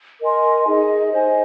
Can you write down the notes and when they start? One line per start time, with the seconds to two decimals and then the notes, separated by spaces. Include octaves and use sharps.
0.22 A#4 D#5 G#5 C6
0.67 D#4 G#4 D#5
1.11 C5 D#5 G#5